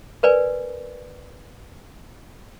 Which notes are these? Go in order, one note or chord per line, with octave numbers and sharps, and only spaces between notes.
A#4 B4 D5 G#5